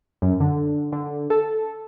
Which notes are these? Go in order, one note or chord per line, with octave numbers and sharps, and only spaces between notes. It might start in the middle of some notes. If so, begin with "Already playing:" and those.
F#2
D3
D3
A4